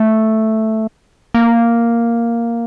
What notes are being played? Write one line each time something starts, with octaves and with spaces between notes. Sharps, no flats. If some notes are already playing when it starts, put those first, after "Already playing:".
Already playing: A3
A#3